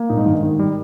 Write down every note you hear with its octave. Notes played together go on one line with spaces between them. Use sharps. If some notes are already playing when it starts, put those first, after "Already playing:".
Already playing: A#3
A#2 D#4
G#2
G2 D#3
G#2
D#3
G3